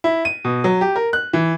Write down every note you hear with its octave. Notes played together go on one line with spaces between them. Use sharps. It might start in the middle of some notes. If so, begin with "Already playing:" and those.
E4
D#7
B2
F#3
G4
A#4
F#6
E3